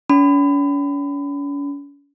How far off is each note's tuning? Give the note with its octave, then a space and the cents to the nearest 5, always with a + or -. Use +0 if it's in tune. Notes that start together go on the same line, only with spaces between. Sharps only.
C#4 +40 B5 +30